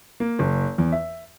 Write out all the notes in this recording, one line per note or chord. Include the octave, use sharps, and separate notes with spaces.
A#3
F#1
E2
E5